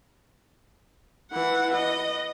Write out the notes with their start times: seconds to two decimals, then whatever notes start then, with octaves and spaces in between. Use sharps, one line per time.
1.31 E3 F#5
1.74 D#5